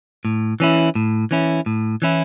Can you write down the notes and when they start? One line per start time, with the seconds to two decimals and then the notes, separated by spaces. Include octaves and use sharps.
0.25 A2
0.60 E3 C#4 E4
0.95 A2
1.31 E3 C#4 E4
1.66 A2
2.02 E3 C#4 E4